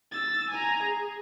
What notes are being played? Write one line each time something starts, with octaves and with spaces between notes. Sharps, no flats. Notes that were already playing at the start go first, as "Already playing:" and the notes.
E6 A6
G#5 A#5
G#4